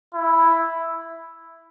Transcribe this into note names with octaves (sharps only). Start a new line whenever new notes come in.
E4